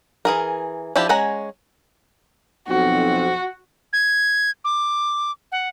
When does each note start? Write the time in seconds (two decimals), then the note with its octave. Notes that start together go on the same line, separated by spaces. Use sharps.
0.25 E3 G#4 A#4
0.96 F3 D4 E4 G4
1.09 G#3 C#4 F#5 G#5 A#5
2.68 B1 F2 C4 F#4
3.93 G#6
4.65 D6
5.52 F#5